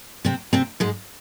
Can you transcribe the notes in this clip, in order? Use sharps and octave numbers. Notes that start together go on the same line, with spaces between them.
C3 C4
C3 C4
G#2 G#3